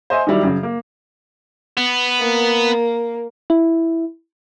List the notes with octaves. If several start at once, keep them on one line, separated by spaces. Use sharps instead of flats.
C5 D#5 E5 G#5
D#3 F#3 G3 E4
F#2 C#3
A#3
B3
A#3
E4